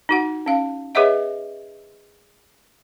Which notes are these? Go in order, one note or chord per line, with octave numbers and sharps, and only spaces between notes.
D#4 F#4 F#5
C#4 F5
G#4 B4 C#5 D#5 E5 F#5